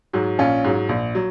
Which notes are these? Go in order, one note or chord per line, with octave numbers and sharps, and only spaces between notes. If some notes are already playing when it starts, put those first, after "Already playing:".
G#2 F#3
A#1 C#4 F4
G#2 F#3
A#1
F#3